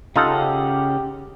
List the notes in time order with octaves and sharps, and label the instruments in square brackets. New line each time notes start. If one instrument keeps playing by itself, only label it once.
[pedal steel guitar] C#3 C#4 F#5 [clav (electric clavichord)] D#4 F4 A4 [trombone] G4